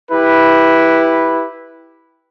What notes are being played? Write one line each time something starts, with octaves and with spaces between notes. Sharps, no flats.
E4 G4 B4